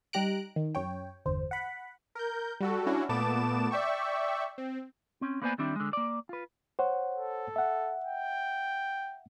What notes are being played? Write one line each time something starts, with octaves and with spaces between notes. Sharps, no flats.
G3 D#4 G4 A#5 F#6 D7
D#3
F#2 C#5 G5
G1 E2 D3 C5
F#5 B5
A#4 G6
G3 F#4 A4
C#4 D4 E4 F#4
A#2 A3 B3 A5 D6 E7
D5 E5 G5 C#6
C4
C4 C#4
A#3 B3 B4 C5 D5 G#5
D#3 G3 C4 D4 E4
D3 G#3
A#3 D5
F4 B4
C5 C#5 F#5
A4
E5 F#5
G5